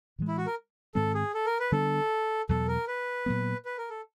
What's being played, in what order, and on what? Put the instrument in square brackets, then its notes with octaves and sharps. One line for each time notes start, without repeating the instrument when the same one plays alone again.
[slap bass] A2 E3 G#3
[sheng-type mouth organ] E4
F#4
A#4
[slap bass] G#2 D#3 G#3 C4 [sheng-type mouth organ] A4
[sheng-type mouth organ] G#4
A4
A#4
B4
[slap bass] D3 G3 B3 D4 [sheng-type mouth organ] A4
[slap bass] E2 B2 F#3 [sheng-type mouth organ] A4
[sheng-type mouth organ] A#4
B4
[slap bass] A#2 F#3 B3
[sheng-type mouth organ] B4
A#4
A4